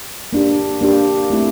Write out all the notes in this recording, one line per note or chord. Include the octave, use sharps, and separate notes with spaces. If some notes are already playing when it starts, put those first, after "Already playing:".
A#3 D4 G4
A#3 D4 G4
A3 C4 E4